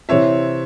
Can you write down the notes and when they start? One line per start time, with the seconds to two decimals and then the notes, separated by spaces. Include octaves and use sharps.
0.09 C3 E3 C4 C#5 E5